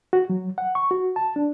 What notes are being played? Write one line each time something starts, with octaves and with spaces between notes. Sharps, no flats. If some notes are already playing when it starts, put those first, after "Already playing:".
F#4
F#3
F#5
C#6
F#4
A5
D4